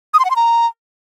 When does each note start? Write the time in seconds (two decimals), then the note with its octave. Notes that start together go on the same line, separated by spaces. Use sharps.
0.14 D#6
0.19 C6
0.25 F#5
0.30 C6
0.36 A#5